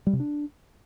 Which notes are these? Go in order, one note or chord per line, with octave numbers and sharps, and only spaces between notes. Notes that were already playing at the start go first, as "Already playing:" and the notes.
G3
C3
D4